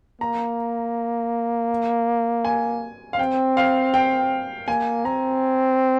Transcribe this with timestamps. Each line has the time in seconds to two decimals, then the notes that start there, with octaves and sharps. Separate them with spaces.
0.21 A#3 A#5
2.45 G#5
3.13 F5
3.19 C4 G5
3.57 F5
3.94 G5
4.68 A#3 G#5
5.05 C4 A#5